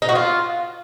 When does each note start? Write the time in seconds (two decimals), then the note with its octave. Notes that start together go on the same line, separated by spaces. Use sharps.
0.02 D#4
0.09 F#4
0.15 F4